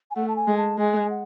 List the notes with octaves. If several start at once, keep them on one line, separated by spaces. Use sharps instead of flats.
G#5
A3 F#5
A5
G#5
G#3
A5
G#3 G#5
F#5